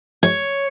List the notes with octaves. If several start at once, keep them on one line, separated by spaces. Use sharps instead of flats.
C#5